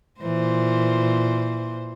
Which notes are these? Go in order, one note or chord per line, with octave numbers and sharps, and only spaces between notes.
A#2 E3 C5